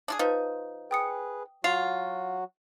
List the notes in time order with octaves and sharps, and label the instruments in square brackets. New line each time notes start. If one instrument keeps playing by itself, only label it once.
[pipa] D4 F4 G#4
[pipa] F3 D#4 [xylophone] B4
[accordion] G#4 B4 [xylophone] G5 D#6 C#7
[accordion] F#3 F#4 [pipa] F4 [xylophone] C7 F7